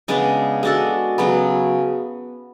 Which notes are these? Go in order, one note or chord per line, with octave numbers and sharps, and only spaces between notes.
C#3 G#3 B3 D4
G#3 D4 F#4 A4
C#3 F#3 B3